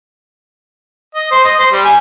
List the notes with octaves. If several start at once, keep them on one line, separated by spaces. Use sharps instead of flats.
D#5
C5
D#5
C5
G3
G#5